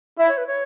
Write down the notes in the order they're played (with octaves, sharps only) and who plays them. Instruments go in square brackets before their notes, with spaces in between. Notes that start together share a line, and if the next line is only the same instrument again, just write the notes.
[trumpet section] E4 [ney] E5
[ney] C#5
B4
C#5